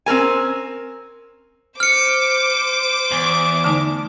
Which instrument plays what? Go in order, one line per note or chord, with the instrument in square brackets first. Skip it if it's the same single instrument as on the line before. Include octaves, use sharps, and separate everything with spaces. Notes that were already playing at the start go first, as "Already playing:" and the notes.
[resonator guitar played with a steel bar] C4 C#4 A#4 G#5
[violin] C5 D6 [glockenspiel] F6 C#7
[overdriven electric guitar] E2
[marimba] D3 A3 D#4